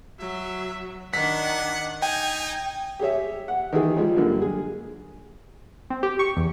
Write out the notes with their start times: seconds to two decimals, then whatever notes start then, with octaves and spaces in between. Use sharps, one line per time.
0.20 F#3 E5
1.14 D#3 D4 F#5 B6
2.02 D#4 G5 G#5
2.99 G4 G#4 C#5 E5
3.48 F#5
3.73 D#3 E3 G#4
3.96 F3 G3 G#3
4.17 F#2 D3 A#3
4.42 G#4
5.90 C4
6.03 G4
6.19 C#6
6.37 E2